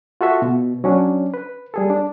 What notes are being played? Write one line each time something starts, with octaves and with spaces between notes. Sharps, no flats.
F4 F#4 A4 E5
B2
F#3 C#4 D4
B4
G3 G#4 A4
D4